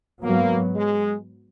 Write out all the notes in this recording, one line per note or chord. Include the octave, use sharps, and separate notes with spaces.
G#2 F#3 A#3 B3
G#3